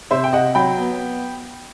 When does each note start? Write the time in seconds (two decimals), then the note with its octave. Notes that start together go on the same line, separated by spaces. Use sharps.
0.11 C3 C5 E5
0.24 G5
0.33 C3 D#5 F#5
0.55 F#3 G5 B5
0.78 B3